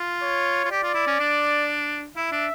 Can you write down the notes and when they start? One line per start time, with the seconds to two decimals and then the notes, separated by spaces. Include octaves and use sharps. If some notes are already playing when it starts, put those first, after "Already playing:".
Already playing: F4
0.22 C#5
0.65 F4
0.71 G4 D5
0.83 F4
0.94 E4
1.07 C#4
1.20 D4
2.16 E4 E5
2.32 D4